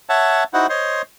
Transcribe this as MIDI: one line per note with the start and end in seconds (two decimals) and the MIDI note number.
0.09 0.44 73
0.09 0.44 76
0.09 0.44 78
0.09 0.44 81
0.54 0.67 63
0.54 0.67 64
0.54 0.67 66
0.54 0.67 72
0.54 0.67 78
0.70 1.02 72
0.70 1.02 73
0.70 1.02 75
0.70 1.02 84